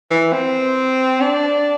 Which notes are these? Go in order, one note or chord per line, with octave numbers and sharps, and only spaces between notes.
E3
C4
D4